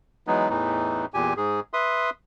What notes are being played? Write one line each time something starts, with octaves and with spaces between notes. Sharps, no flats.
E3 F#3 G#3 B3 D#4
E2 A2 E3 D#4
E2 A#2 G4 G#5
G#2 G#4
B4 E5 C6 D#6